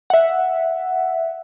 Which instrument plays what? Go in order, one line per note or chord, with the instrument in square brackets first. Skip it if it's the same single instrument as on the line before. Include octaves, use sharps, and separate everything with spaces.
[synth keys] E5 F#5